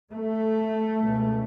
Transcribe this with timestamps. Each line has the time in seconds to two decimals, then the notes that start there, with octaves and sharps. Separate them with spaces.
0.13 A3
1.02 C#2 B2